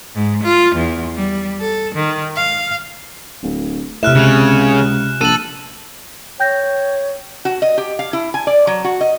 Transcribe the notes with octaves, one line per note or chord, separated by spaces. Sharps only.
G#2
F4
E2
G3
A4
D#3
F5
D1
A2 C3 E5 F6 F#6 E7
C#2 C#3
A#1 A4 D#7 F#7
C#5 G5 G6 A#6
F#4
D#5
G4
F5
E4
G#5
D5
F#3
F#4
D#5